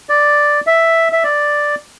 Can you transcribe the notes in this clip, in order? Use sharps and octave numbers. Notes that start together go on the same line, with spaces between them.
D5
E5
E5
D5